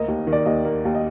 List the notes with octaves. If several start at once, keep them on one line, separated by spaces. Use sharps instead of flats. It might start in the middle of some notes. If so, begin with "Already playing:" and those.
Already playing: D2 A#3 D#5
D#2
D#3
D5
D#2 D#5
A#3
D#2
D#5